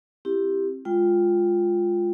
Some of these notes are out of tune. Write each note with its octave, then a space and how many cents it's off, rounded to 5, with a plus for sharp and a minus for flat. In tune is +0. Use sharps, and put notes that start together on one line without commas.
C4 +25 E4 +10 G4 +0
G#3 +0 F4 +5 G5 +0